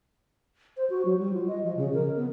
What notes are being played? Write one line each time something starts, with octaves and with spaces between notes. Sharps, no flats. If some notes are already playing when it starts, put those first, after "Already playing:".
C5
F#4
F#3
G3
F4
D#5
F3
C#3
A#4
B3